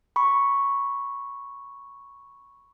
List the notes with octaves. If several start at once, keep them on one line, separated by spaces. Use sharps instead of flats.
B5 C#6